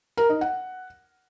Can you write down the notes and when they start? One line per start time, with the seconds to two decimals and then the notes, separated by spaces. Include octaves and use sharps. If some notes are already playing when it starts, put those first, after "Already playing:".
0.17 A#4
0.29 D#4
0.41 F#5